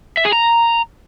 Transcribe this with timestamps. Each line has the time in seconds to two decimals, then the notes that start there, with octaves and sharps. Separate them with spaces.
0.17 E5
0.25 G#4
0.33 A#5